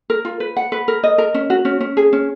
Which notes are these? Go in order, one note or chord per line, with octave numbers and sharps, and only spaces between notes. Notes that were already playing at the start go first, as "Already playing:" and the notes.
A#4
F4
B4
F#5
B4
A#4
D#5
A#4
C#4
F#4
C#4
C#4
G#4
C#4